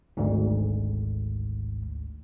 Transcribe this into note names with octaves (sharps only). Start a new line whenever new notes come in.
G#1 D2 G#2